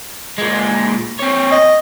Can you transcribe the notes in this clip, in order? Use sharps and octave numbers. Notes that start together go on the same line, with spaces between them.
A#2 G#3
C4 C#5
D#5